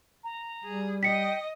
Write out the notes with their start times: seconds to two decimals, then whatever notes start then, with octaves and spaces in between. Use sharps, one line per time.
0.24 A#5
0.64 G3 G#4
1.03 D#5 G5 B6 C#7